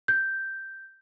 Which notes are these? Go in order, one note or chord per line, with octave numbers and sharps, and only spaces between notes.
G6